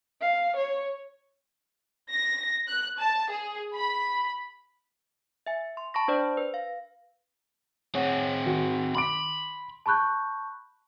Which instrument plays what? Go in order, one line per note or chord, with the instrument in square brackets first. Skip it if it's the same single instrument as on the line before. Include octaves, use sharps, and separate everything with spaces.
[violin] F5
C#5
[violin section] A#6
F#6
A5
G#4
B5
[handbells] E5 G#5
C6
A5 B5 C#6 A#6
D4 C5 D5
B4
F5
[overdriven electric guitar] C4 G#4 [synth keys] C#5 F#5 D#7
[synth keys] D#3 [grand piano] F#4
[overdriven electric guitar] B5 [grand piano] C6 D6 D7
[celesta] A5 B5 C#6 F#6 G6